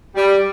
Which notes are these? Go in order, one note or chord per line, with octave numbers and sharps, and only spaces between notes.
G3